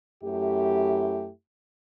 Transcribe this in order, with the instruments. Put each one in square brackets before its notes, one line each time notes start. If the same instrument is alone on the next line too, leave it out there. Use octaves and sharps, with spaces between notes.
[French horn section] F#2 A3 E4 G4